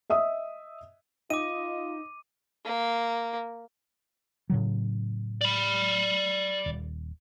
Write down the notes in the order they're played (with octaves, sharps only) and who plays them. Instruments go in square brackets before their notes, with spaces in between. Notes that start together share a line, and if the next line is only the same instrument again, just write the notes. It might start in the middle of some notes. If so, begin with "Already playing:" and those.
[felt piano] D#5 E5 D#6
[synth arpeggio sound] D#4 [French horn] F4 [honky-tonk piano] D#5 [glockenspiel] D6 D#7
[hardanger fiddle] A#3
[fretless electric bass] A2 C#3 F#3
[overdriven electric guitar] D5 B5
[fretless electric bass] D#1